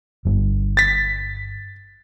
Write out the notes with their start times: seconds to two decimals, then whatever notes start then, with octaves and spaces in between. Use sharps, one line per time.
0.25 G1 G2
0.77 A6 B6